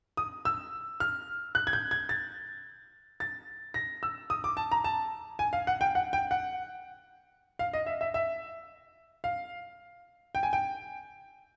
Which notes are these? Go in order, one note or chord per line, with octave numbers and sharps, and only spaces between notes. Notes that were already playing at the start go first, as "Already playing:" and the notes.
D#6
E6
F6
F#6
G#6
G6
G#6
A6
A6
A#6
E6
D#6
D6
A5
A#5
A5
G#5
F5
F#5
G5
F#5
G5
F#5
F5
D#5
E5
E5
E5
F5
G5
G#5
G5